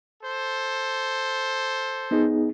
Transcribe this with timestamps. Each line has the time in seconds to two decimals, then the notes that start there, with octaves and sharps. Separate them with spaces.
0.22 A4 C5
2.11 B3 D#4 G#4